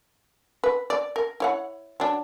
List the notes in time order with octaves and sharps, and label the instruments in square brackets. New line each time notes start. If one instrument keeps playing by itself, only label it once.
[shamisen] B4
D5
A#4
E4 C#5 F#5
F#3 D4